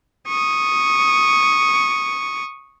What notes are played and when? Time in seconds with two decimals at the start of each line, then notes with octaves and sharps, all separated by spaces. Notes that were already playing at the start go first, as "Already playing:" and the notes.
0.29 C#6 D#6